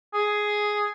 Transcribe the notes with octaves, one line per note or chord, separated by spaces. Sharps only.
G#4